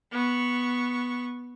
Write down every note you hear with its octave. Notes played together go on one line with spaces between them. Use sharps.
B3 C#6